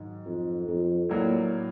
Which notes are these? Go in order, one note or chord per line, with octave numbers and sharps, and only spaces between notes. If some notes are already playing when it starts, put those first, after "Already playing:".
Already playing: G#2 D#3 F#3
F2
F2
A2 F#3 A#3 D4